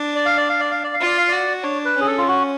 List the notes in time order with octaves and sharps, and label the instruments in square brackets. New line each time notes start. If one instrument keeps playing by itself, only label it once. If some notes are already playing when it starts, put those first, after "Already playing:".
Already playing: [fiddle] D4
[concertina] D5
F5
D5
F5
D5
F5
D5
F5
[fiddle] F4 [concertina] D5
[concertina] F5
[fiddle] F#4 [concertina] D5
[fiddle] D4 [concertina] C#5
[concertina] B4
[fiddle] C#4 [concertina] G#4
[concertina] A4
F4
F#4